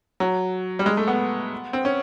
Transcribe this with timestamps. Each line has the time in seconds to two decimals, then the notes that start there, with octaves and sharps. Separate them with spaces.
0.20 F#3
0.79 G3
0.86 G#3
0.97 A3
1.08 B3
1.73 C4
1.85 C#4